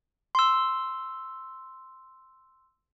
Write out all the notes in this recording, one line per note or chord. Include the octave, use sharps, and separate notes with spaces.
C6 E6